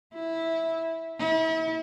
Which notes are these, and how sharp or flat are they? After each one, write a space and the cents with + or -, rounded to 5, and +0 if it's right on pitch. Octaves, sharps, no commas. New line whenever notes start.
E4 -10
E4 -35